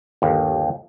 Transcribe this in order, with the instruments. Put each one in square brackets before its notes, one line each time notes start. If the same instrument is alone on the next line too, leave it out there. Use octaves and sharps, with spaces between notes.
[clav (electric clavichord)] G1 D#2